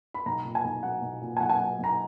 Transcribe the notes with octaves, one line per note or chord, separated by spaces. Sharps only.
B5
B1 A#5
A#2
G#5
B1
F#3 F#5
B1
A#2
G#5
B1 F#5
G#5
F#5
F#3
B1 A#5